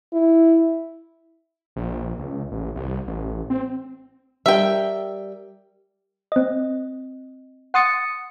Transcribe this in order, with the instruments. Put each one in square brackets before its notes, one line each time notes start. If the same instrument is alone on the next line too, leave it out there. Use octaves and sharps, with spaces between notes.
[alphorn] E4
[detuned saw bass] A#1
C#2
A1
C2
A1
C4
[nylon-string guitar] G3 A#4 [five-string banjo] E5 G5
[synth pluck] C4 D#5
F#5 C6 D#6 A6 C#7